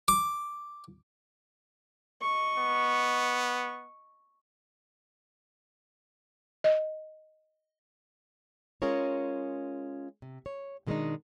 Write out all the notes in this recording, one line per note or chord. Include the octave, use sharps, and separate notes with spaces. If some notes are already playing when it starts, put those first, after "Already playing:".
D6
D#5 C#6
B3
D#5
G#3 C#4 F4 G#4 A#4 C#5
C3
C#5
B2 D#3 G#3 A#3 D4 D#4